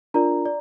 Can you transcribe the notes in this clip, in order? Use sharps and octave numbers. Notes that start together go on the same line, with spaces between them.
D4 F4 A#4 D5 A#5
D5